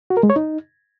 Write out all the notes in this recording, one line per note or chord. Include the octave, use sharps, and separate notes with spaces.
F#4
A#4
G#3
C#5
D#4